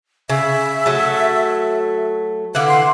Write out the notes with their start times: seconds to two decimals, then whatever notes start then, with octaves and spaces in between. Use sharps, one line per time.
0.29 C#3 E5
0.86 F#3 A3
2.55 D3 E3 F5 F#5
2.68 C6